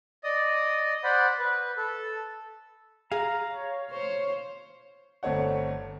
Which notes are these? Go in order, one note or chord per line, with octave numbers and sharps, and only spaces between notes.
D5 D#5 D#6
C5 D5 F#5 B5
B4
A4
G#4 F5 A#5
C#5
C5 C#5 C#6
G1 A3 C4 C#5 F#5